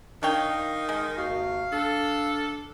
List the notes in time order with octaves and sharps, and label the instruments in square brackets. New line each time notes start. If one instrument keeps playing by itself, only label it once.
[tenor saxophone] D#3 [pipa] D4 C#5 G5 [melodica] F5
[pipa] G#3
[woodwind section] D#2 C3 F#4 [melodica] F5
[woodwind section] D4 [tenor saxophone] A4